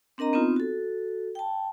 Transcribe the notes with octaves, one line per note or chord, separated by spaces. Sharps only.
C4 D4 A#4 D#5 A#5
B3 C4 D#4 F4
F#4 A4
G5 A5